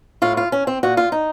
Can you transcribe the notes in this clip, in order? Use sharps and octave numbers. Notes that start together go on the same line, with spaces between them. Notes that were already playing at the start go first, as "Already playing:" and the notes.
A2 F4
F4
C#4
C4
A#2 F#4
F4
D#4